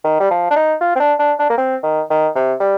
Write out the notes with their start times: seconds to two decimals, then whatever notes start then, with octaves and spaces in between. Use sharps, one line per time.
0.05 D#3
0.20 G3
0.31 F3
0.51 D4
0.56 D#4
0.81 F4
0.96 C4
1.00 D4
1.20 D4
1.39 D4
1.50 A#3
1.58 C4
1.83 D#3
2.10 D#3
2.36 C3
2.60 G3